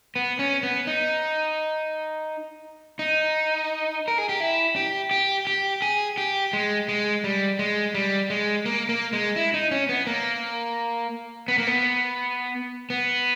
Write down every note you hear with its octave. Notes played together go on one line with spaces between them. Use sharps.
B3
C#4
B3
D#4
D#4
A#4
G#4
G4
E4
G4
G4
G4
G#4
G4
G#3
G#3
G3
G#3
G3
G#3
A#3
A#3
G#3
E4
D#4
C#4
B3
A#3
B3
A#3
B3
B3